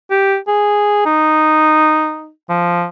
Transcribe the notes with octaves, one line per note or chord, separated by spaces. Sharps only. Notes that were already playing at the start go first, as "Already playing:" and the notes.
G4
G#4
D#4
F3